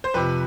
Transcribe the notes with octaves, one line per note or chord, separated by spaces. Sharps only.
C5
F2 C3 F3 B4